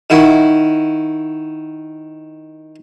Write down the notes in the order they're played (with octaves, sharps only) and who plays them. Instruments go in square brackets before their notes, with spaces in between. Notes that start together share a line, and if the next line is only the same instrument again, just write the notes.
[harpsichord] D#3 E4 F#4